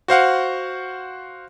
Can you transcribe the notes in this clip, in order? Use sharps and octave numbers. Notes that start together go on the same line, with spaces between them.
F#4 C5 F5 F#5